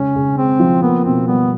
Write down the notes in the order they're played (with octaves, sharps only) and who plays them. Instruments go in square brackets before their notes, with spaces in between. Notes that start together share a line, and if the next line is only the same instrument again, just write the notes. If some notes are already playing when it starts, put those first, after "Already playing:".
Already playing: [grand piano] C#3 G#3 [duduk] C#4
[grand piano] C#3
[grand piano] G#3 [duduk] C4
[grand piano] F3
[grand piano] A#3 [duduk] B3
[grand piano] B2 [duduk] C4
[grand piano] G3 [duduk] B3